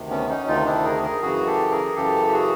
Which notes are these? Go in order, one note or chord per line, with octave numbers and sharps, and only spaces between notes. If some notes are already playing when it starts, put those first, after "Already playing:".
Already playing: D2 C3 D#3
B3 C#4
C#4 D#4
D2 C3 D#3 D#4 F4
D4 E4
G#4 A#4
G#4 A#4
F#2 C#3 E3 F#4 G#4
G4 A4
G#4 A#4
F#2 C#3 E3 G4 A4
G4
F#4 G#4